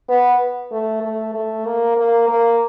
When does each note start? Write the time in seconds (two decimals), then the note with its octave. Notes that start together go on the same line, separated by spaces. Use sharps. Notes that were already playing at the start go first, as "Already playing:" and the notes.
0.09 B3
0.72 A3
1.02 A3
1.34 A3
1.65 A#3
1.97 A#3
2.29 A#3